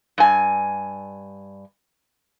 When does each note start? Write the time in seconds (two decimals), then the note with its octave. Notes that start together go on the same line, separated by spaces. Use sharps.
0.18 G2 G#5